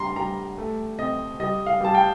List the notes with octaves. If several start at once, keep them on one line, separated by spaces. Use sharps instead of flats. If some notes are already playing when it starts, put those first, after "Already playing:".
Already playing: D3 G3 A#5 C6
G3 A#5
A3
C4 D#5
G3 D#5
F5
G3 A5
G5